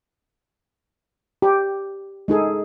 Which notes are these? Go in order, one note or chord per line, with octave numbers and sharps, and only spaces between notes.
G4
G#3 D#4 G#4 A4